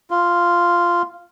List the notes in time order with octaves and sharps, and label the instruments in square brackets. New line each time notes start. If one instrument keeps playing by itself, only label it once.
[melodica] F4